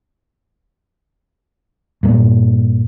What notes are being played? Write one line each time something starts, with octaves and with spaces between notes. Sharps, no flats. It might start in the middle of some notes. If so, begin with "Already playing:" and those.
G2 A#2